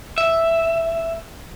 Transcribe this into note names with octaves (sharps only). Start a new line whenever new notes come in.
E5